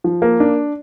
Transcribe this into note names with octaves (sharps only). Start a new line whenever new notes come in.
F3
A#3
D4